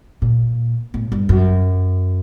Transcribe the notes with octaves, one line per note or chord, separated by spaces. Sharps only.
A#2
A2
G2
F#2